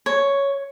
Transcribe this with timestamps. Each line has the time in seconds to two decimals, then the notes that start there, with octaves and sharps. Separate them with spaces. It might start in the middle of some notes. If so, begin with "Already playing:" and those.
0.06 C#5